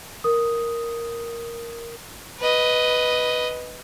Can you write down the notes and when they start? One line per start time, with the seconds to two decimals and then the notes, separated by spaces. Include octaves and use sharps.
0.24 A#4 D#6
2.39 B4 D#5